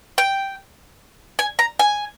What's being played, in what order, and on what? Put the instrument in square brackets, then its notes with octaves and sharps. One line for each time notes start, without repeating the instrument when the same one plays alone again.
[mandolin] G5
G#5
A#5
G#5